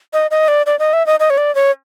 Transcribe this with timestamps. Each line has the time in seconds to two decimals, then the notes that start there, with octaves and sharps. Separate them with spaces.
0.13 D#5
0.31 D#5
0.48 D5
0.66 D5
0.79 D#5
0.93 E5
1.07 D#5
1.20 D#5
1.30 C#5
1.38 D5
1.55 C#5